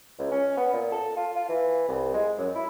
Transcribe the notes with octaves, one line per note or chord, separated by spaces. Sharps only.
C#2
C#4
B3
A#2
A4
F4
F4
E3
C2
G#3
F#2
E4